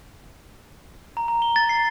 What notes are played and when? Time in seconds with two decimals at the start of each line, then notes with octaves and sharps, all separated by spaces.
1.17 A#5
1.28 A#5
1.42 G7
1.56 A6
1.69 C7